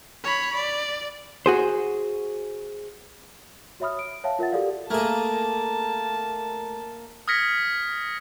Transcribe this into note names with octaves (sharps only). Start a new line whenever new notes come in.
C#5 B5
D5
F#4 G#4 C5
F#4 C#5 E5 B5 D#6 F6
D7
C#5 E5 F5 G5 A5
F4 A#4 E5 F#5 A6
F#4 G4 A4 A#4 D5 F5
A3 A#3 G#4 A5
D#6 F6 G#6 A#6 B6 C#7